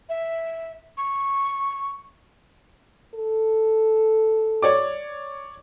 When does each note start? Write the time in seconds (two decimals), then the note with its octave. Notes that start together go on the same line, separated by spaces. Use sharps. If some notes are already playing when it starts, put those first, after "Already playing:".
0.09 E5
0.97 C#6
3.15 A4
4.62 C#5 D5 D6